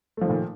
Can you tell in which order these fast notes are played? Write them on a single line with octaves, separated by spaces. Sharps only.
A3 F3 D#3 A#2